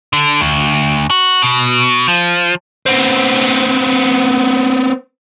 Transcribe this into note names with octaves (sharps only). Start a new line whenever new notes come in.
D3
D2
F#4
B2
F3
B3 C4